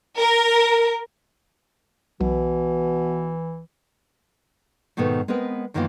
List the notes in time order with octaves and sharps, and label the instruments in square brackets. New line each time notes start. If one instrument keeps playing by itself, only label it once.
[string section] A#4
[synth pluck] B1 [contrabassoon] B2 [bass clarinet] E3
[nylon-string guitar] G#2 B2 D#3 A3 B3
G#3 B3 C4 A#4 B4
F#2 D#3 E3 A#3 B3 F4